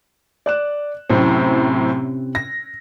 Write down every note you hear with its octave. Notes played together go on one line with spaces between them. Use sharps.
D5 F#6 E7
F#2 A2 C3 C4 C#4 E4
A#6